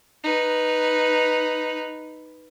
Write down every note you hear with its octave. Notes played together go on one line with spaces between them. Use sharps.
D#4 B4